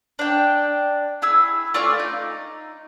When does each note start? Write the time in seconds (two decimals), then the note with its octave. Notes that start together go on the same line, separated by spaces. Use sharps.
0.19 D4 G5
1.22 E4 G#4 E6
1.74 A3 F4 D5 G#5
1.99 D#4